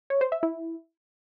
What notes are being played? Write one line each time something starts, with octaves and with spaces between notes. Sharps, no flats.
C#5
C5
E5
E4